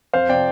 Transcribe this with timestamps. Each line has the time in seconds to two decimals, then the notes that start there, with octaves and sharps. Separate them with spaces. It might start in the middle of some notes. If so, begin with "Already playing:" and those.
0.13 F2 C5 F5
0.29 C3 F3 D5 G5